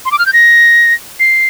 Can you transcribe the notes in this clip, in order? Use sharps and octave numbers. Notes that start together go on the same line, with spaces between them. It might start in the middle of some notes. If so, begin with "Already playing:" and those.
C6
D6
F6
G6
A#6
C7